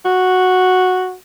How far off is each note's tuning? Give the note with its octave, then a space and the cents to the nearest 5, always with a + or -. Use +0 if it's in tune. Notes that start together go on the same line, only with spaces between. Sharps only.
F#4 -5